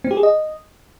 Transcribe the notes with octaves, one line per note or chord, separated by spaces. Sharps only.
C4
G4
G#4
D#5